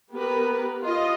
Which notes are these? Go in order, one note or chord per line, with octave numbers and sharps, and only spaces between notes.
B3 G4 A#4 B4
F4 D#5